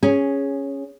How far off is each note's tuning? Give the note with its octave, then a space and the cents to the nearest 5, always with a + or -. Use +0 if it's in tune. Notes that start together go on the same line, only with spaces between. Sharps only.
C#4 +0 G#4 -5